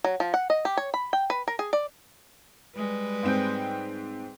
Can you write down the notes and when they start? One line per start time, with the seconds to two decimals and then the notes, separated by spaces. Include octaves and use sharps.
0.04 F#3
0.20 F3
0.34 F#5
0.50 D#5
0.65 G4
0.77 C#5
0.94 B5
1.13 G5
1.30 B4
1.48 A#4
1.59 G#4
1.73 D5
2.76 G3 G#3 B4
3.23 G#2 C4 G5